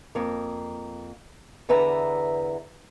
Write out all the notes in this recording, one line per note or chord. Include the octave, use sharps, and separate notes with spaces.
F2 A#3
E2 D3 B4 E5 A#5